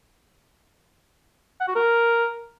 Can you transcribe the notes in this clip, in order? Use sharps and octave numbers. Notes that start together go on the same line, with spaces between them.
F#5
F#4
A#4